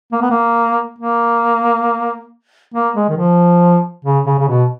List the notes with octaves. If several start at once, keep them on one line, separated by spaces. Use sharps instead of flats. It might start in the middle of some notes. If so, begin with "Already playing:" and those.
A#3
B3
A#3
A#3
A#3
G#3
D#3
F3
C#3
C#3
C#3
B2